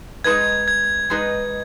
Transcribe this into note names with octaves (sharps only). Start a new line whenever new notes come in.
G#3 D#4 G#4 B4 D#5 G#6
G#6
G#3 D#4 G#4 B4 D#5